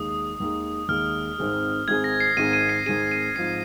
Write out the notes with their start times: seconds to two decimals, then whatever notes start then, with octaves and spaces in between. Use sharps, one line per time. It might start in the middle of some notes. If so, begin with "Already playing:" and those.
Already playing: D#2 D#3 G#3 D#6
0.40 D#2 D#3 G#3
0.88 D#2 D#3 G#3 F6
1.38 G#1 G#2 D#3 C4 G#4
1.88 G#1 G#2 D#3 C4 G#4 G#6
2.04 A#6
2.20 C7
2.37 G#1 G#2 D#3 C4 G#4 D#7
2.53 D#7
2.69 C7
2.86 G#1 G#2 D#3 C4 G#4 D#7
3.11 D#7
3.36 G#2 F3 C4 C7